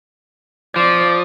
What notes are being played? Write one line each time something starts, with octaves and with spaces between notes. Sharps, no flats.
F3 D5